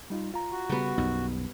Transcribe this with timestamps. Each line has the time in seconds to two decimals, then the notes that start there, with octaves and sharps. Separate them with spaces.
0.10 G3 D#4 F4
0.34 F4 A#5
0.52 F#4
0.69 C#3 G3 B3
0.98 B1 F#2 D#4